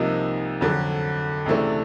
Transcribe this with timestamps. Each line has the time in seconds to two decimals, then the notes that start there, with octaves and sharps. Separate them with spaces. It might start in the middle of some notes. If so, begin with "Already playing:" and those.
Already playing: C2 C3 F3 A#3 D#4
0.61 F2 D3 F#3
1.46 C#2 C3 E3 A3 D4